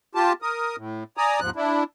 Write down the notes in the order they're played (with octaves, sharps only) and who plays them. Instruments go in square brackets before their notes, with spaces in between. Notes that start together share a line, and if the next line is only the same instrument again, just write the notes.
[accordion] F4 G4 A5
A#4 D#6
A2
D5 G#5 A#5 D#6
D#2 G#2 F3 F#6
D4 E4